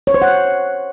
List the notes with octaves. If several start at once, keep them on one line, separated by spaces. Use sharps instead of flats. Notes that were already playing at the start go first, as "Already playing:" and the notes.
C#5
C5
F#5